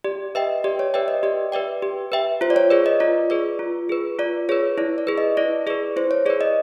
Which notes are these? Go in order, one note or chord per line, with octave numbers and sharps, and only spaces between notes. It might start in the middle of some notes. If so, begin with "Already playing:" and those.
G4 D5
B4 D#5 E5 G5
G4 D5
C#5
B4 D5 E5 G5
D#5
G4 D5
B4 D5 E5 G5
G4
B4 E5 G5
F4 C5
D5
C#5
G#4 B4 D5
D#5
F4 D5
G#4 B4 D5
F4
G#4 B4
F4 D5
G#4 B4 C#5
E4 D5
D5
G#4 B4
D#5
E4 D5
G#4 B4 D5
E4 C5
C#5
G#4 B4 D5
D#5